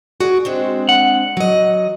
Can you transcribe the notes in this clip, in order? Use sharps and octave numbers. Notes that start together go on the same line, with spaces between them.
F#4 G#4 D5
G#3 C4 D4
F#5
F#3 D#5